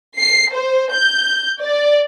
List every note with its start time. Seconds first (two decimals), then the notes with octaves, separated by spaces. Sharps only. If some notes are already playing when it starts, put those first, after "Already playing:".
0.19 C7
0.54 C5
0.94 G6
1.63 D5